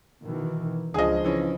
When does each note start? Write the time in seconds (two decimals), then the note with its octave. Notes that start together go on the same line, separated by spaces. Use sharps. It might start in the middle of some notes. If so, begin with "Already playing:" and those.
0.22 B2 D#3 E3
0.94 C#2 C#3 F3 D4 G#4 D#5
1.24 E3 C#4